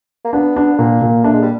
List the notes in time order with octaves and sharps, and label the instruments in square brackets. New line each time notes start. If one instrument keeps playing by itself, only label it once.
[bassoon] A#3
[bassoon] B3 [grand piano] D4
[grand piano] D4
[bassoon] B3
[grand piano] A#2 [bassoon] A#3
[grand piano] A#2
[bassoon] A3 [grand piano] D4
[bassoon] G#3
G3